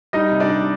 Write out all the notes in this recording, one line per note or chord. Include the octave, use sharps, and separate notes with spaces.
G3 D#4 D#5
C3
D4 D5
G3